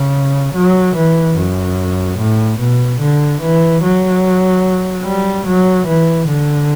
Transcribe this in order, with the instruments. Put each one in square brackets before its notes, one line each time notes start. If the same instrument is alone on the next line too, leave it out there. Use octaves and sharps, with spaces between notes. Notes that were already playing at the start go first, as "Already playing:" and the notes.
Already playing: [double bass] C#3
F#3
E3
F#2
A2
B2
D3
E3
F#3
G3
F#3
E3
D3